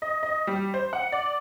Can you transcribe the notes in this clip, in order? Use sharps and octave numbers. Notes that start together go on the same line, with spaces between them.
D#5
D#5
G3
C5
F#5
D5